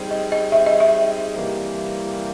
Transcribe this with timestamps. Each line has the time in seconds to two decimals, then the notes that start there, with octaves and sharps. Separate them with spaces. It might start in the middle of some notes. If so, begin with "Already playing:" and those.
Already playing: G3 C4 D#4 G#4
0.11 D#5
0.32 D#5
0.52 E5
0.66 D#5
0.80 E5
1.36 C3 E3 G3 A#3